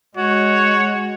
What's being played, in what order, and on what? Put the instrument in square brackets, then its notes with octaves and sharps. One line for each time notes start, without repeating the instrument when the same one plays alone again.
[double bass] G#3 [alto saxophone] F#4 [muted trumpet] C#5